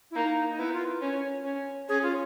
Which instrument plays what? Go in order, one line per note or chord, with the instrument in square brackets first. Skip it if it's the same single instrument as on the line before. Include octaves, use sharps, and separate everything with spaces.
[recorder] E4
[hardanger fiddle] A#3 [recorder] D#4
[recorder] D#4
[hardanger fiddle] B3 [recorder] E4
[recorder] F4
[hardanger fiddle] C#4
C#4
[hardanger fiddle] C#4 [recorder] G#4
[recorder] F4